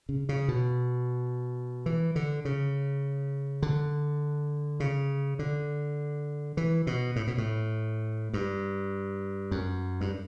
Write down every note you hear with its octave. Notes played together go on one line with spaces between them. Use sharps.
C#3
C#3
B2
E3
D3
C#3
D3
C#3
D3
E3
B2
A2
B2
A2
G2
F#2
G2